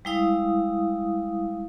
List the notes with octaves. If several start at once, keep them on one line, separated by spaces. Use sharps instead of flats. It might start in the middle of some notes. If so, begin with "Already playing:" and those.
G3 G#3 E4 F5 D#6